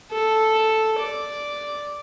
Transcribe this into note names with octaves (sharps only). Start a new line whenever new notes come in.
A4
D5